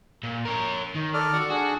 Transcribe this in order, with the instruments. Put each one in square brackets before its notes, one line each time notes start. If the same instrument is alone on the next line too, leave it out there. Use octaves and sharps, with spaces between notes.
[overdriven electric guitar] A#2
A#4 C#5
D#3
[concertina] A4 D5 F6
[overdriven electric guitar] F#4
[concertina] D4 G#4 [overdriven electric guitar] F#4